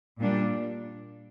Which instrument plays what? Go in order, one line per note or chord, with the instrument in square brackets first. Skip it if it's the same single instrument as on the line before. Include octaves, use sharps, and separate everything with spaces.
[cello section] A#2 G3 D4